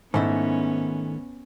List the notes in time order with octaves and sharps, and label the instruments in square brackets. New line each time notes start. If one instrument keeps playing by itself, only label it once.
[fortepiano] G#2 [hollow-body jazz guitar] D#3 A3 E4 [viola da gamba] B3 C#4